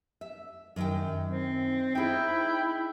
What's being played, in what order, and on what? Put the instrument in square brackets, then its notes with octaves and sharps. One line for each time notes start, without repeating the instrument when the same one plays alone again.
[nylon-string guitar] E5
F#2 D#3 G5
[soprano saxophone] C4
[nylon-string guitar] D#4 G#4 [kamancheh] E4 [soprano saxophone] G5